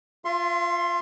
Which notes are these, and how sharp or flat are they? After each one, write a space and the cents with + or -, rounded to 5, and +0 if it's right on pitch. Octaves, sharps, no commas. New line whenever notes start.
F4 +0 F5 -45 C6 +20